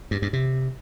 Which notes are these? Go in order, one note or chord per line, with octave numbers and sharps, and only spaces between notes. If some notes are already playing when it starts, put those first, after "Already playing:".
G2
G2
C3